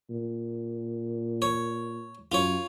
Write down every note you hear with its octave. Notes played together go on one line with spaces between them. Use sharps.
A#2
C#5
F#2 F4 C#5